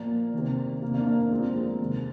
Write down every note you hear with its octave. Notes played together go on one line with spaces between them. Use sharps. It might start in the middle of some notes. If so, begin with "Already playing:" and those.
Already playing: A#2 F3 A#3
C3 D#3
C3 D#3 A#3
A#3 D4
A#3 D4
A#2 F3 G#3 C4
A#3
G#3
G#3
C3 D#3